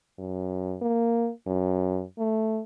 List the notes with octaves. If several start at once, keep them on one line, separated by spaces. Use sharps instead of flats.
F#2
A#3
F#2
A3